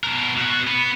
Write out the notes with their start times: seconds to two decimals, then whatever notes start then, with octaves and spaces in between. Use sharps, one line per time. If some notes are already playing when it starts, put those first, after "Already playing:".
0.04 B2 A#4
0.37 B2 F#4
0.67 B3